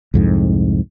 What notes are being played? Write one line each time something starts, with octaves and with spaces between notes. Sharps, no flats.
C2 F2 G#2